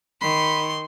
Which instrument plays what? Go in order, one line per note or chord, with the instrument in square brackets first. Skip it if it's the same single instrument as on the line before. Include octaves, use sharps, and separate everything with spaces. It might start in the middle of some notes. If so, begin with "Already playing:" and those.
[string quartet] D#3 [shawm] B5 [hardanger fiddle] C6